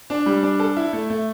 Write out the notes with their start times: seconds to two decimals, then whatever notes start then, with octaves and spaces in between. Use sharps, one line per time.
0.10 D4
0.26 G3
0.43 D4
0.59 A4
0.76 E4
0.93 A3
1.10 A3